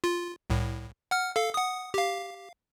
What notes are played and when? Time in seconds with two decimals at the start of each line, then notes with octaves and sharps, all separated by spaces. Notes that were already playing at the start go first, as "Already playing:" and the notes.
0.04 F4
0.50 C2 A2
1.11 F#5 F6
1.36 A4 F5
1.54 F#5 D#6
1.94 G4 F5